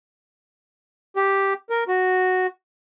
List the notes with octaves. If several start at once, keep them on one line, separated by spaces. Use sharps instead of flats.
G4
A#4
F#4